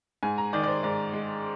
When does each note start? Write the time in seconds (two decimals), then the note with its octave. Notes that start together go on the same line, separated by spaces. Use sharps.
0.23 G#2 G#5
0.38 A#5
0.53 D#3 D5
0.63 D5
0.68 C5
0.83 G#2 D5
1.13 G#3